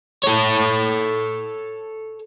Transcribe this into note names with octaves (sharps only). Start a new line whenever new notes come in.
A4 C#5